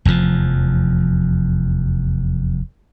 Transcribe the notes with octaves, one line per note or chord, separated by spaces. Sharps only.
F1 E2 G#2 F3